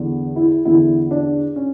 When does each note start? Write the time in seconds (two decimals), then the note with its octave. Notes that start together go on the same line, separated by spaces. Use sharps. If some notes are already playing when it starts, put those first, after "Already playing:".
Already playing: E2 D3
0.36 E4
0.65 E2 D3 E4
1.11 D4
1.56 C#4